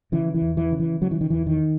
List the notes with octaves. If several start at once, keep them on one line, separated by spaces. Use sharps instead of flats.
C#3 E3
E3
E2
E3
C#3
E3
C#3 F#3
E3
D#3
E2 E3
D#3